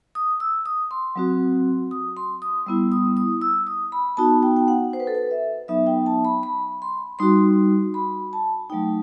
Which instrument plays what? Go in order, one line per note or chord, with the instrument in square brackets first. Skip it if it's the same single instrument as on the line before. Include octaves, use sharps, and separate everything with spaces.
[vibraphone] D#6
E6
D#6
C6
F#3 C4 F#4
D#6
C6
D#6
G3 B3 E4 E6
D#6
D#6
E6
D#6
B5
B3 D#4 F#4 A5
G5
G5
F#5
C5
B4
A4
B4
E5
F#3 B3 D#4 E5
G5
A5
B5
B5
C6
G3 D#4 F#4 C6
B5
A5
D#4 G5
F#3 A3